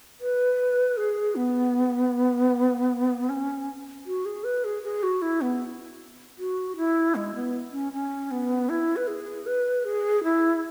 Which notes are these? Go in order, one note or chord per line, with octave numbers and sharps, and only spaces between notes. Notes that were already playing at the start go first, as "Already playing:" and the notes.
B4
G#4
B3
C#4
F#4
G#4
B4
G#4
G#4
F#4
E4
B3
F#4
E4
G#3
B3
C#4
C#4
B3
E4
B4
G#4
B4
G#4
E4